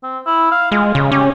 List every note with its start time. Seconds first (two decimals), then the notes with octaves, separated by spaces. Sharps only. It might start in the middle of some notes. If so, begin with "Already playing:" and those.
0.03 C4
0.27 E4
0.52 F5
0.72 G#3 F4
0.95 C#3
1.12 C#4 G4